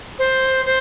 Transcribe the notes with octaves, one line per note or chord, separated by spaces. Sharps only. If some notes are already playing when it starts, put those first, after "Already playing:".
C5
C5